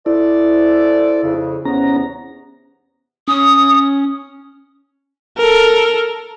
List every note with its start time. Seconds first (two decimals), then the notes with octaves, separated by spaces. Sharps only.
0.06 E4 A4 C5 D5
1.24 F2 C#3
1.65 E2 C3 B3 C#4 A#5
3.28 C#4 D#6
5.38 A4 A#4